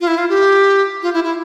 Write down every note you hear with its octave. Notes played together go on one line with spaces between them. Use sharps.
F4
E4
F4
G4
F4
E4
E4